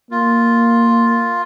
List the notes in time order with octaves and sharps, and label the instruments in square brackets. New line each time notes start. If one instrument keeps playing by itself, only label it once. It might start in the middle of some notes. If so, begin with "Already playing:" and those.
[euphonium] A#3 [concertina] F4